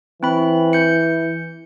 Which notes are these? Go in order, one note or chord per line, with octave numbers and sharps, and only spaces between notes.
E3 C4 B5
G6 C#7